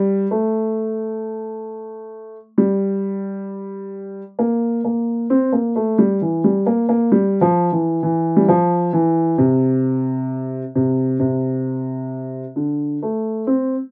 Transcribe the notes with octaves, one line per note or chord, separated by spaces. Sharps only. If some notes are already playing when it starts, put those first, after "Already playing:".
Already playing: G3
A3
G3
A#3
A#3
C4
A#3
A3
G3
E3
G3
A#3
A#3
G3
F3
E3
E3
G3
F3
E3
C3
C3
C3
D3
A3
C4